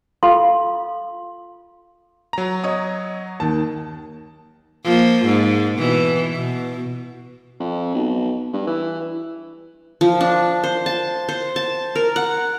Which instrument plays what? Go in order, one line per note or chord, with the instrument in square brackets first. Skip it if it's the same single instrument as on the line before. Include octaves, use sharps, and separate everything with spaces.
[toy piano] F4 A4 F5 C6
[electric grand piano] F#3 A#5
[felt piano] C#5 D#5 D#6
[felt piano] D#2 D#3 [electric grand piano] A5
[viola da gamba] F3 A#3
G#2
B2 E3
B2
[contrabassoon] F2
B1
G2
E3
[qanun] F3
D4
C5
A5
C5
A5
A#4
F#5